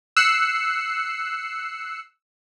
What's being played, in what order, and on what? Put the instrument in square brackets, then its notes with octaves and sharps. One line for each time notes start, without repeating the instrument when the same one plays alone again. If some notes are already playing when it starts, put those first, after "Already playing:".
[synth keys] E6 F#6 C7 C#7